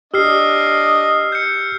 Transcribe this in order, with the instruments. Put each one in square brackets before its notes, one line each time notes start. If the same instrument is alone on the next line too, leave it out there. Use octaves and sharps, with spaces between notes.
[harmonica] D4 D#5 [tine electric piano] G4 [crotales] E6 F6 C7
[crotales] G6 C#7